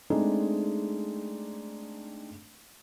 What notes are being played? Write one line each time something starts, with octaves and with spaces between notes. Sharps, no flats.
G#3 A3 C4 D4 D#4 G#4